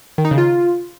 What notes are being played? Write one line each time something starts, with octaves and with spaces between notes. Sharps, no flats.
D#3
D#4
C#3
F4